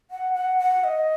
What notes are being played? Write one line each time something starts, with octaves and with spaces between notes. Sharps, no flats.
F#5
F#5
F#5
D#5